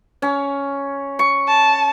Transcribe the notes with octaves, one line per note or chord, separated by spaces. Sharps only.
C#4
C#6
A5